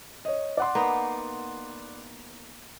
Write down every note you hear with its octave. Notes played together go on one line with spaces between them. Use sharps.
C#5 D#5
D5 F#5 C6
A#3 B3 D#4